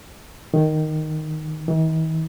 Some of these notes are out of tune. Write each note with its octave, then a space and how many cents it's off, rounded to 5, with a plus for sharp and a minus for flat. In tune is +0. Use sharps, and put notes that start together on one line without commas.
D#3 -5
D#3 +45